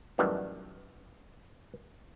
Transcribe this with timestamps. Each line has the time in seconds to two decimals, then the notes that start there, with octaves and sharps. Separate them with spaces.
0.18 F#2 A2 D#3 E3 G3 B3